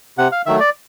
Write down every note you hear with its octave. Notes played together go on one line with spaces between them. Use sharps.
C3 F#5
F5
D#3 F#3 A3 E5
D5